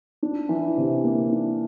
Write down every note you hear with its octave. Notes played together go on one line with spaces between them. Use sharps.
D4
E3
C3
A#3
D4